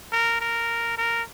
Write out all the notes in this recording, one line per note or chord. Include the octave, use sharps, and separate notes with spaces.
A#4
A#4
A#4